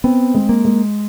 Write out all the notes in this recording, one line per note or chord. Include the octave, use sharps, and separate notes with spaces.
B3 C4
G#3
A#3
G#3